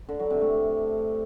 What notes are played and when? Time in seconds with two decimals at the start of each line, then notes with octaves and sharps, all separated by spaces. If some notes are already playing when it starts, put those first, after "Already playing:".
0.09 D3
0.20 F#3
0.30 C3
0.41 A3